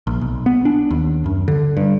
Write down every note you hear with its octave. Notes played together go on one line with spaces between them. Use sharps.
A#1
B1
B3
D4
D#2
F#2
D3
G2